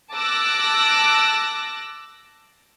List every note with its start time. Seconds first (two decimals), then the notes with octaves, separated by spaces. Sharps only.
0.14 A5 D6 E6 F#6 A#6